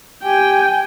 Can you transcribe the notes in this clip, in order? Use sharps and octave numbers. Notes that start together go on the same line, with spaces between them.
G4 G5 G#5